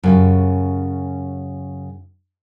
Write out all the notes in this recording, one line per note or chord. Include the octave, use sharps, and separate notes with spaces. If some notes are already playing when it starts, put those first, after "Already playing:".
F#2 C#3 G4